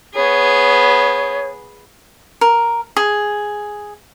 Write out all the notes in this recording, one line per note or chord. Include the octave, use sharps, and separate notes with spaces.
B3 G#4 C#5
A#4
G#4